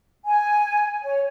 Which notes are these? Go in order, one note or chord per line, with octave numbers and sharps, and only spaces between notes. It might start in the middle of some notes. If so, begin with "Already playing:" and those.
G#5
C#5